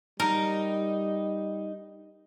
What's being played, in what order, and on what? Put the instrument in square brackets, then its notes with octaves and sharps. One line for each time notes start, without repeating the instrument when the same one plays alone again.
[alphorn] G3 [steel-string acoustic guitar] D#4 [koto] A#4